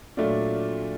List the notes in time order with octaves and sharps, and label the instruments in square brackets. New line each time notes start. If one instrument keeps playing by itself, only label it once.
[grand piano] A#2 F#3 A3 D4 F4